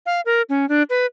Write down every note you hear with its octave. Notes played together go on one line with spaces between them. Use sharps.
F5
A#4
C#4
D4
B4